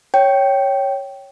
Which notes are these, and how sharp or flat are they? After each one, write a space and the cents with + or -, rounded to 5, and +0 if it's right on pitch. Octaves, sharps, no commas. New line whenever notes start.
C#5 +0 G5 -10